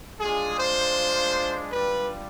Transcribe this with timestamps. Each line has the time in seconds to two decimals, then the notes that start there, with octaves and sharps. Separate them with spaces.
0.20 G#3 D4 F4 G#4
0.59 C5
1.72 G3 D4 F4 B4